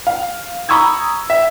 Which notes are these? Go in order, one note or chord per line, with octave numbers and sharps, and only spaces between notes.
F5
A#5 B5 C#6 D#6 E6 G#6
E5